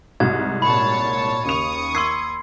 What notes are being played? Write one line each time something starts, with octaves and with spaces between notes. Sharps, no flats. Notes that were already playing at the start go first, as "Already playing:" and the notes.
C2 G#2 F#4 G#6
A#2 C#5 A5 B5
D#2 C#3 C#6 D#6 F7
C6 E6 G#6 C7